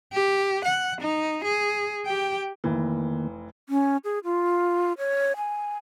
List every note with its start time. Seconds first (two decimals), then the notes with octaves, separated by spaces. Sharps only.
0.13 G4
0.65 F#5
1.01 D#4
1.44 G#4
2.05 G4 G5
2.64 F1 D#3 E3 A#3
3.69 C#4
4.04 G#4
4.24 F4
4.98 C#5
5.37 G#5